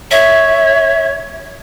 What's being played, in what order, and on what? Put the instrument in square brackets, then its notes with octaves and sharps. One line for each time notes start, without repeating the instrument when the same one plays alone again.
[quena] C#5 [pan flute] E5